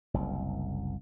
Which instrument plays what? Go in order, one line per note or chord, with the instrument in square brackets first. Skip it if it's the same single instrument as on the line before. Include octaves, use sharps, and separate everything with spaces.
[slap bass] F#1 C2